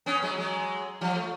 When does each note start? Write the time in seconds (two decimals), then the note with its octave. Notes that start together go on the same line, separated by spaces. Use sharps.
0.06 B3 C#4
0.22 F#3 G#3
0.38 F#3 G#3
1.01 F3 G3
1.14 A3